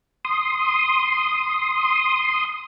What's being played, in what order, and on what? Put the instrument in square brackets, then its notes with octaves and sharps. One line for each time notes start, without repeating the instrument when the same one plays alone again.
[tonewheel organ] C6 D#6